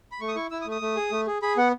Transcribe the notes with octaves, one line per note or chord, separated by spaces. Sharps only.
B5
A3 C#6
D#6
E4 C#6
E4 E6
D#6
A3
D#6
A3
G#4
A3
G#4
G#4 B5
B3 F#5